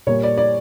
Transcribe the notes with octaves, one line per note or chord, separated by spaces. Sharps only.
A#2 G3 A#3 C#5
D5
D5